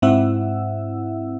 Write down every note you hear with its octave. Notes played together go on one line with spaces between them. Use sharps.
G#2 C4 E4 E5 F#5 E6